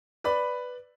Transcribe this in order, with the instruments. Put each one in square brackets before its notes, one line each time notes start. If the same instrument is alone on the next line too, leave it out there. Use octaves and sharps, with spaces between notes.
[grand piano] B4 D5 B5